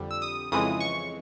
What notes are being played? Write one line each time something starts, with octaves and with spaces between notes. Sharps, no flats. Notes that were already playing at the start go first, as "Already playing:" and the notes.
Already playing: F2 D3 G3
E6
D#6
F2 C#3 E3 G#3 D#6
C#6